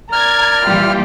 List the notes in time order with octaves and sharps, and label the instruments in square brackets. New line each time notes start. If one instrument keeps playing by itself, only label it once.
[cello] A#4 D5 [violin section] A#5 G#6 [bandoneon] F6
[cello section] A#2 E3 G3 [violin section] F4 G4